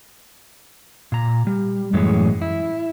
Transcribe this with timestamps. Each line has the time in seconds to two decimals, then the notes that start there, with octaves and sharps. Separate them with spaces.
1.12 A#2 A#5
1.47 G3
1.93 F#2 A2 E3 G#3 C#4
2.42 E4